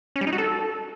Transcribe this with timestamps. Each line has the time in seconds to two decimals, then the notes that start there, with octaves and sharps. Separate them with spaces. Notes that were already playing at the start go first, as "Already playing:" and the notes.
0.16 C#4
0.21 G3
0.27 D#4
0.33 F#4
0.38 A4